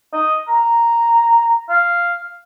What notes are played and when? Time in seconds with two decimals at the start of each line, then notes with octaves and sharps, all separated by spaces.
0.13 D#5
0.48 A#5
1.69 F5